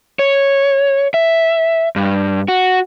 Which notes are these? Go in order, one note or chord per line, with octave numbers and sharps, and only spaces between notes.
C#5
E5
G2
F#4